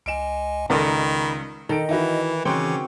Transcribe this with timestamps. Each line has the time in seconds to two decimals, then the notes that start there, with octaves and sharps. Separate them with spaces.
0.06 C#2 D#5 G#5 D7 E7
0.70 C#2 D#3 A4 A#4 D5 D#5 B5
1.69 D#3 A4 D#5 D7
1.89 E3 D#4 E4 F#4
2.45 C#3 E3 C4 F#4 G5 D6 C#7